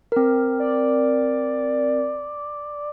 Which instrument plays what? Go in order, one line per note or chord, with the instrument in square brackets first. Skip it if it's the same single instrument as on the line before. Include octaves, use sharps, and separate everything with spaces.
[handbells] C4 A#4
[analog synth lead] D5